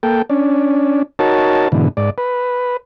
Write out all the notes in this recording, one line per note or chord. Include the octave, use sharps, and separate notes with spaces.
A#3 A4 G5
C#4 D4
D#4 F#4 A#4 C#5 A5
G#2 B2 D3 E3
G#2 D5
B4